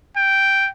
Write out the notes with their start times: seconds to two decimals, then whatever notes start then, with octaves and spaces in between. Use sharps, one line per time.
0.16 G5